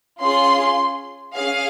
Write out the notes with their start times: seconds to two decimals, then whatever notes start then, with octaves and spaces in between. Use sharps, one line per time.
0.21 C#4 F4 G#4 C6
1.35 C#4 G#4 F5